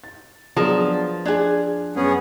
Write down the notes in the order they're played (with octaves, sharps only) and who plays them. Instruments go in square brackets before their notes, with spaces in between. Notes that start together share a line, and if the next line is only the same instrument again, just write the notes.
[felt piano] A6
[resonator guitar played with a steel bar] F3 [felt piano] F#3 B3 D4 [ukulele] G#4 A#4 A5
[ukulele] D4 G#4 [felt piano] D5 F#6 G#6
[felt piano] F#2 [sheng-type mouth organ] B3 C#4 G#4